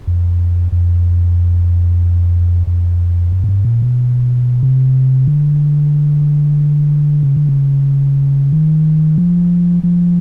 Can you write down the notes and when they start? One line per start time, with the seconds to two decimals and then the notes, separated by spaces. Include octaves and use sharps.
0.07 F2
0.72 F2
2.67 F2
3.32 F#2
3.44 G#2
3.49 G2
3.65 A#2
3.82 B2
4.63 C3
5.28 D3
7.23 C#3
7.36 D3
7.49 C#3
8.53 D#3
9.18 F3
9.83 F3